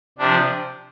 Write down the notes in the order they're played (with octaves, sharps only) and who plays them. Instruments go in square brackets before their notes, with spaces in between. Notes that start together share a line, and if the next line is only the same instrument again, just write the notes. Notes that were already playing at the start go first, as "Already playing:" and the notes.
[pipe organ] C3 F3 D4